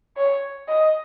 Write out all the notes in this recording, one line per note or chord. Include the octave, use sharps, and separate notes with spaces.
C#5
D#5